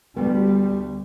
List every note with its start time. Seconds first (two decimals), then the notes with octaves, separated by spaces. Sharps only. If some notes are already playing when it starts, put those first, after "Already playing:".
0.16 D2 G3 B3